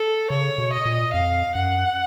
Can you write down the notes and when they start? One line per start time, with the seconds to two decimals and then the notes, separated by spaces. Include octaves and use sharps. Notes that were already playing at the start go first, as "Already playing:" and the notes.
Already playing: A4
0.30 C#3 C#5
0.58 B2
0.72 D#5
0.85 A#2
1.13 F2 F5
1.55 F#2 F#5